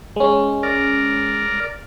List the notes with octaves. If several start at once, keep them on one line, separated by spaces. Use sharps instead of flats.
G#3 C#4
A#4 D5